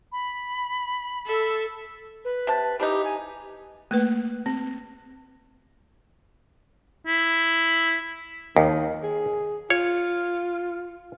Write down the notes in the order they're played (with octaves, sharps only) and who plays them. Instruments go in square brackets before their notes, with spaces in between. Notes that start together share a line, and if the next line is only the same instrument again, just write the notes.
[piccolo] B5
[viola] A4 E5
[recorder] B4
[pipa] C3 A5
[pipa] E3 D4 D#4 [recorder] G4
[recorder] G#5
[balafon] A3 A#3 B4
C4
[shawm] E4
[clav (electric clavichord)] D#2 [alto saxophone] D#3
[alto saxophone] G#4
[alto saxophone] F4 [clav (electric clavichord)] C#5